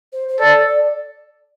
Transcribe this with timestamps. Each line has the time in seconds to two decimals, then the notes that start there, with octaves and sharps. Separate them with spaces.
0.13 C5
0.29 C5
0.40 A4 D5
0.67 D5